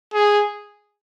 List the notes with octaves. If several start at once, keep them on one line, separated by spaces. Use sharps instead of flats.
G#4